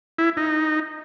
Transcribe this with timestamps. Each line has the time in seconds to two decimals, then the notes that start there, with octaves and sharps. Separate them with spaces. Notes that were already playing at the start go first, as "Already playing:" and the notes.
0.18 E4
0.37 D#4